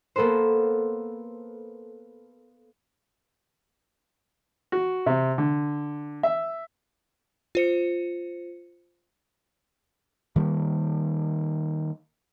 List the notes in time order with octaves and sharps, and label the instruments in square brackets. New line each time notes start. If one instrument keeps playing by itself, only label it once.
[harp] A#3 B3 A4 B4 C5
[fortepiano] F#4
C3
D3
E5
[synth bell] F4 C5 C#7
[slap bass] D#3 G3 A#3